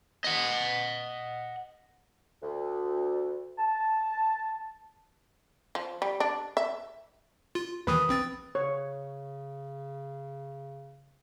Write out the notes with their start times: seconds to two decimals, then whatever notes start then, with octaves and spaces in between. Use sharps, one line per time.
0.24 D#5 F#5
2.42 D2
3.58 A5
5.75 F3
6.02 G3
6.20 D4
6.57 E5
7.55 F4
7.87 D#2 D#3 E3 B4 D#6
8.09 A#1 C4 A6
8.55 C#3 C#5